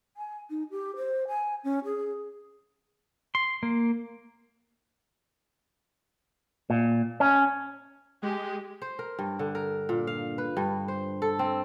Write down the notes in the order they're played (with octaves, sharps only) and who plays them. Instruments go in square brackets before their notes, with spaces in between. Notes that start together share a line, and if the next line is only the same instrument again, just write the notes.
[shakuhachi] G#5
D#4
G4
C5
G#5
C#4
G#4
[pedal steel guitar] C6
A#3
[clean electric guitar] A#2
C#4
[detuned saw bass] G#3 [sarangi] G4
[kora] C5
A#4
G2
D3
A#4
A#2
F5
B4
G2
C5
A4
C4